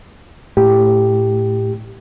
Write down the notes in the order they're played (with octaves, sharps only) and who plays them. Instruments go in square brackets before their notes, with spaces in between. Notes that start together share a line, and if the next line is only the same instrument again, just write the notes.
[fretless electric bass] A2 [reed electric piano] G4